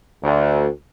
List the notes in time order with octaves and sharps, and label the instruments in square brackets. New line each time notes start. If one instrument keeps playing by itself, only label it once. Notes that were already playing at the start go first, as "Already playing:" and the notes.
[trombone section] D2